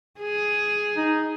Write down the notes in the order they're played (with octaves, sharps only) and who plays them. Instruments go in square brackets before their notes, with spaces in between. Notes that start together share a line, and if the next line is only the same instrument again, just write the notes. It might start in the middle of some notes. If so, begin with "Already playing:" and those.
[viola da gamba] G#4
[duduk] D#4